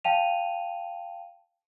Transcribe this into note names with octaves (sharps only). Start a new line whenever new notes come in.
F5 G5 A5 D#7 F7